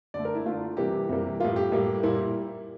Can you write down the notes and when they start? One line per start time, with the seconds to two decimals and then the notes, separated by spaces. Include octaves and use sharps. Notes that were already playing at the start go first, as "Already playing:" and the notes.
0.14 D3 A3 D5
0.25 A#4
0.35 E4
0.45 D3 A3 F4
0.77 C3 E3 G3 A#3 G4
1.09 C3 E3 G3 A#3
1.40 A2 G3 A#3 F4
1.56 G4
1.72 A2 G3 A#3
2.03 A#2 G3 A#3 E4